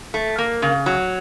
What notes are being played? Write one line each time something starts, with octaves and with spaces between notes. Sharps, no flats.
A3
A#3
C#3
F#3